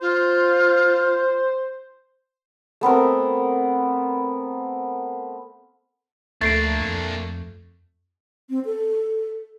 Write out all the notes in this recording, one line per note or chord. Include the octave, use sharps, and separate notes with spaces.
F4 C5
A3 B3 C4 A#4
D2 A3 A#3 D4 A6 C7 D7
F2
C4
A4